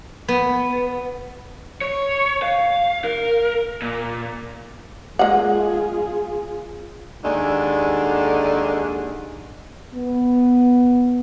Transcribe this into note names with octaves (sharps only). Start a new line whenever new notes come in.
B3
C#5
F5
A#4
A#2
G#3 A#3 F4 G#4 F#5
D#2 D3 G#3 D4
B3